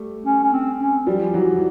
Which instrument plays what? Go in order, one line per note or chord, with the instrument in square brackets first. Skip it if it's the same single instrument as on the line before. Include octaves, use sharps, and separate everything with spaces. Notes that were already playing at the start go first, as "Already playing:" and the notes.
Already playing: [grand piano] G3 A3
[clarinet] C#4
C#4
C4
C#4
[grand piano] F3 G3
E3 F#3
E3